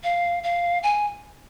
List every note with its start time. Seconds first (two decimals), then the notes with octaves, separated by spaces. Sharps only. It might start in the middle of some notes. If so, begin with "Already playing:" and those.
0.04 F5
0.43 F5
0.83 G#5